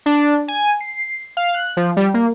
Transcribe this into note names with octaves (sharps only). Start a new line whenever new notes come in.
D4
G#5
C7
F5
F#6
F3
G3
A#3